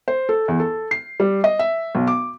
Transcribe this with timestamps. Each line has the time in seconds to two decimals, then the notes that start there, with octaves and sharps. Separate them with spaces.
0.08 C5
0.29 A4
0.48 E2
0.60 A4
0.91 C7
1.20 G3
1.44 D#5
1.59 E5
1.95 B1
2.07 D6